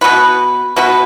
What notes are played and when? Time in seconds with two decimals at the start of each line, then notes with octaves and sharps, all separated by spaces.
0.01 B2 B3 F#4 B4
0.76 B2 B3 F#4 B4